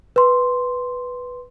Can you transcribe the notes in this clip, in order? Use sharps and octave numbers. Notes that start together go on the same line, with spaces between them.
B4 C6